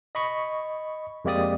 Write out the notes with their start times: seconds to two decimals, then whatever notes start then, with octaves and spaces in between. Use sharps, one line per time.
0.15 D#5 B5 C#6 C#7
1.25 F2 G#3 A#3 G4 D5 D#6